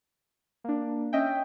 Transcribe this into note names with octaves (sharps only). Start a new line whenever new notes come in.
A#3 D4
C#4 D#5 E5 G5